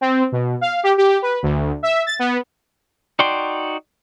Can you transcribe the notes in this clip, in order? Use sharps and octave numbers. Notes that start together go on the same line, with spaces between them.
C4
B2
F5
G4
G4
B4
D2
E5
A6
B3
D#4 F#4 D5 G5 C6